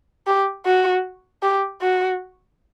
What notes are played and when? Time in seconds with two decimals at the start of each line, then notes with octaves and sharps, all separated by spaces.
0.27 G4
0.66 F#4
1.43 G4
1.82 F#4